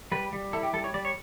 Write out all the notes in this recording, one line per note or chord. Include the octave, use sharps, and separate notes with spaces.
G3 B4
G3
E4 A4
G4
G3 A4
C#5
G3 D5
C#5